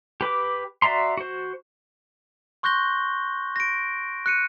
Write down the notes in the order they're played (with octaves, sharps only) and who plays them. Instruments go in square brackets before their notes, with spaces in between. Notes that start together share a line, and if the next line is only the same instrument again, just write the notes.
[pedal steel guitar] G4 B4 D6
F#4 D5 E5 A#5 C6
F#4 C5
[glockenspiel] C6 C#6 F#6 G6 A#6 G7
A#6 D7
F#6 C#7 D#7